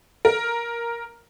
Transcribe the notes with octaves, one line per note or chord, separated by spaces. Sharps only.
A#4